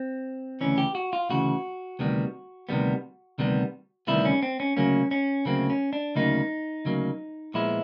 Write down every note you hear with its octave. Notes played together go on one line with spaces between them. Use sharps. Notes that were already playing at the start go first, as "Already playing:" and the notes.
Already playing: C4
D2 C#3 E3 C#4
G4
F#4
F4
D2 C#3 E3 F#4
D2 C3 D#3 G3 B3
D2 C3 D#3 G3 B3
D2 C3 D#3 G3 B3
D2 C3 D#3 G3 B3 E4
C#4
C4
C#4
D2 C#3 F#3 A#3 C#4
C#4
D2 C#3 F#3 A#3 C4
C#4
D4
D2 C#3 F#3 A#3 D#4
D2 C#3 F#3 A#3
A#2 F3 G#3 B3 E4